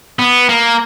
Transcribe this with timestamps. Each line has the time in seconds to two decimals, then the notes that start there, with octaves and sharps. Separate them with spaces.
0.19 B3
0.49 A#3